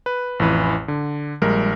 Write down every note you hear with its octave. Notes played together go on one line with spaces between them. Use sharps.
B4
A1 F2 E3 B4
D3
A#1 G3 G#3 A#4